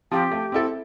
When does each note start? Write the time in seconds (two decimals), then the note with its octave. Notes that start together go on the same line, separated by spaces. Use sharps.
0.11 F3 C4 F4 G4
0.32 A3
0.52 C4 E4 A4